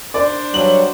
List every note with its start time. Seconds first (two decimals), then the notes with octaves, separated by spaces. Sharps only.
0.14 D4 C5 D5
0.54 G2 F#3 F#7